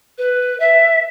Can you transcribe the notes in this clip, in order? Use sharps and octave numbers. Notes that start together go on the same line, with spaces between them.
B4
E5